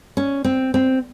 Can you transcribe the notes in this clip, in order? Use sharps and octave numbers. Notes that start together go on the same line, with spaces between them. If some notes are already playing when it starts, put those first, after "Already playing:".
C#4
C4
C4